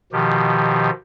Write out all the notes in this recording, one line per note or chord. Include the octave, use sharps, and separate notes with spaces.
B2 D#3 F3 G4